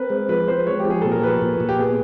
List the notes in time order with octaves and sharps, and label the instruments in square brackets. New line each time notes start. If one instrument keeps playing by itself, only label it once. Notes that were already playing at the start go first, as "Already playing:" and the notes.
Already playing: [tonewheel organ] C4 [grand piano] A#4 B4
[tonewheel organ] G#3
[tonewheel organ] F3 [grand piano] B4
[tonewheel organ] C4 [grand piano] C5
[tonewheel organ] G#3 [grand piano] C#5
[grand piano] G4
[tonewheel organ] F3
[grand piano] G#4
[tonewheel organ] A#2 [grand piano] A4
[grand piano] A#4
[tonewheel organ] F3 [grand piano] B4
[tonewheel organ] A#2
A#2
[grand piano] G4
[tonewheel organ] B3 [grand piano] G#4